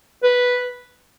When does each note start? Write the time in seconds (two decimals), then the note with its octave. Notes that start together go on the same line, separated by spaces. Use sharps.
0.23 B4